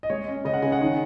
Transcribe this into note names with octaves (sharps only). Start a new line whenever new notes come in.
D#5
G#3 C#5
C#4
C#3 D#5
F#5
C#3 G#5
F#5
D#3